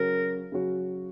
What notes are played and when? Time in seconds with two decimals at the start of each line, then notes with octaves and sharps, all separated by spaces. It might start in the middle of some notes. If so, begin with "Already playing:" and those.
Already playing: C#3 F#3 C#4 F#4 A#4
0.52 C#3 F#3 C#4 F#4